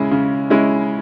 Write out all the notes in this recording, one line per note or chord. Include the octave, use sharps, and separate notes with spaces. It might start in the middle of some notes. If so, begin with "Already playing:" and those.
Already playing: C#3 G#3 C#4 E4
C#3
G#3 C#4 E4